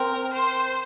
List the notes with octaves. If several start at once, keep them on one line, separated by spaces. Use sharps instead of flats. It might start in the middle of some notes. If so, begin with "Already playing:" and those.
Already playing: C4 A#4
C5